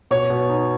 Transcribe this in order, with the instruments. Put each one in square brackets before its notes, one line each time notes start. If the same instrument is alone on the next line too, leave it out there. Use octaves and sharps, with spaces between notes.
[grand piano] B2 [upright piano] C#5
[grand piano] B2
D#4